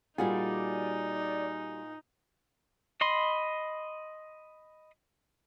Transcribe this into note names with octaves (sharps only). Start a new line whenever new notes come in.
A#2 G3 D#4 F4 F#4 G#4 D5 G#5
D#5 B5 C6